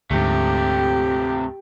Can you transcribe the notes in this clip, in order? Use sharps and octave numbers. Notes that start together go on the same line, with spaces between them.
D2 G#2 C3 A3 G4